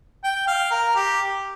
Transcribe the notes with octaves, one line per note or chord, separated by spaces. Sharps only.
G5
F5
A#4
G4